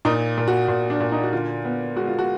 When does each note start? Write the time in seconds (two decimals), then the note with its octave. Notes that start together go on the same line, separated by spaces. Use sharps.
0.05 A#2 D#4
0.38 A#2
0.48 F#4
0.68 A#2
0.90 D4
1.00 A#2
1.12 D#4
1.23 F#4
1.32 D3 F4
1.65 B3
1.96 G#3 F#4
2.07 F4
2.19 F#4